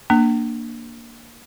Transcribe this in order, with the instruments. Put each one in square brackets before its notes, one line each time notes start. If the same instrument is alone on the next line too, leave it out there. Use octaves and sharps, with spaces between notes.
[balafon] A#3 D4